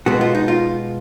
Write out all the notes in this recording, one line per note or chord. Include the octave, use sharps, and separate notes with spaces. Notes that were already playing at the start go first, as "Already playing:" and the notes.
B2 G#3 B3 F#4
F4
D#4
F4